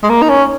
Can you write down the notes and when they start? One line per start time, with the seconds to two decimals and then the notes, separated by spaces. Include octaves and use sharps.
0.03 G#3
0.10 A#3
0.22 D#4
0.29 C#4